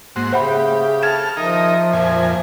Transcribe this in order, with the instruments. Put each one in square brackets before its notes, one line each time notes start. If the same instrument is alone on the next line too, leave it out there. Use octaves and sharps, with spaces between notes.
[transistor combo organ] G#2 F#4 C5 [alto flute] A#3
[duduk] C#3 [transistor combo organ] G4 [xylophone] C5 F#5 B5 [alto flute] E5
[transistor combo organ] A4 F6 [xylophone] G#6 E7
[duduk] F3 [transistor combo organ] D#4 A#4 [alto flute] E5
[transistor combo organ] F2 A#2 G#5